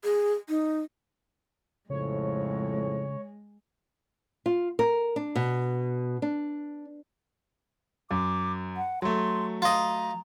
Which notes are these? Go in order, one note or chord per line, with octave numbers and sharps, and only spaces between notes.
G#4
D#4
F2 A2 C#3 G#3 C#5
F4
A#4
D4
B2
D4
F#2 D6
F#5
F#3 A3 C6
F4 D#5 A#5